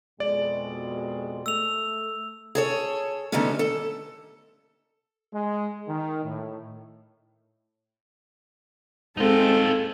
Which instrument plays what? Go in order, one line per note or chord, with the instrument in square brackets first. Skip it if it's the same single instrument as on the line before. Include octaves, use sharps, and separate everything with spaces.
[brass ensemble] F2 B2 G#3 [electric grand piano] D5
[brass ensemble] A3 [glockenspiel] E6 F7
[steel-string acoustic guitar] G#4 A4 C#5
D3 D#3 G3 A3 B3 C#4
A4
[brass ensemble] G#3
D#3
A2
[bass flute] G#3 [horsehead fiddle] C4 [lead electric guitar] D#4 F4 [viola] A4